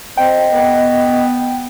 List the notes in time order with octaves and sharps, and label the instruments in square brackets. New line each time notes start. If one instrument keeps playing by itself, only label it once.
[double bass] C4 [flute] D#5 [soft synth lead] G5
[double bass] B3